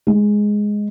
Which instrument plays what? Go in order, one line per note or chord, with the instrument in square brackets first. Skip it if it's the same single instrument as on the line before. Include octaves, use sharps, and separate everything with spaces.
[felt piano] G#3